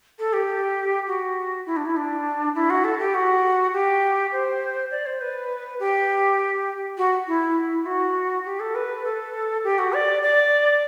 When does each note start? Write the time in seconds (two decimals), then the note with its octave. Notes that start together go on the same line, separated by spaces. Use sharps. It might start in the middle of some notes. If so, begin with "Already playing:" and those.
0.19 A4
0.33 G4
1.07 F#4
1.66 E4
1.77 D4
1.86 E4
1.96 D4
2.55 E4
2.70 F#4
2.84 A4
2.99 G4
3.14 F#4
3.73 G4
4.32 C5
4.91 D5
5.06 C5
5.21 B4
5.80 G4
6.98 F#4
7.27 E4
7.71 E4
7.86 F#4
8.45 G4
8.60 A4
8.75 B4
9.04 A4
9.64 G4
9.79 F#4
9.93 D5
10.22 D5